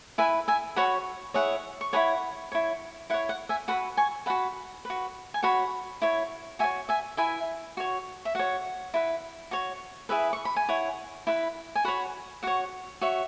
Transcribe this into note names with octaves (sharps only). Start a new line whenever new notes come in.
E4 B4 E5 G#5
E5 G#5
F#4 C#5 F#5 B5
E4 G#4 C#5 F#5
C#6
E4 G#4 C#5 F#5 B5
E4 C#5
E4 C#5 F#5
F#5
E5 G#5
F#4 B4 F#5 B5
G#5 C#6
F#4 B4 F#5 B5
F#4 B4
G#5
F#4 C#5 F#5 B5
E4 C#5
F#4 C#5 E5 G#5
E5 G#5
E4 B4 E5 G#5
F#4 C#5
E5
F#4 C#5 F#5
E4 B4
F#4 C#5
E4 G#4 B4 E5
C#6
B5
G#5
E4 C#5 F#5
E4 B4
G#5
F#4 C#5 F#5 B5
F#4 C#5 F#5
F#4 C#5 E5